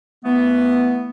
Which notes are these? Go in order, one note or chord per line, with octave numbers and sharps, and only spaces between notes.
E3 A3 B3